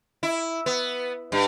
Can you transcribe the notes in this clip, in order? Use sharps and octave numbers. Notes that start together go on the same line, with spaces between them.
E4
B3
G2